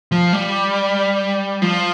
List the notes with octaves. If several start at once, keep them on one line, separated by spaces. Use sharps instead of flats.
F3
G3
F3